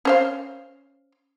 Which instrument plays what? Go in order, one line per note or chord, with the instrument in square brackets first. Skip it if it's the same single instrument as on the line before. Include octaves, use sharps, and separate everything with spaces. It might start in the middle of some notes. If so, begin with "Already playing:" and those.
[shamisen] C#4 C5 F5